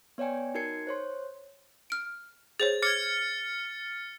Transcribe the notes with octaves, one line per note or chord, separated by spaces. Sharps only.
B3 C#5 D5 G5 G#5
D#4 F#4 A#4 G#6 C7 C#7
C5 C#5 C6
F6 D7
G#4 C5 C#5 A6
D6 F6 G#6 A6 C#7